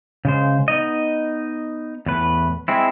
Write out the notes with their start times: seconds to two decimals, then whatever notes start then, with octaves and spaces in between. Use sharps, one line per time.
0.25 C#3 G#3 C5
0.68 B3 D#4 D#5
2.06 E2 A2 B4
2.68 G#3 C4 E4